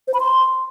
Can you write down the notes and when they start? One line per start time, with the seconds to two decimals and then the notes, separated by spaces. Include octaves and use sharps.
0.08 C5
0.14 B5
0.20 C6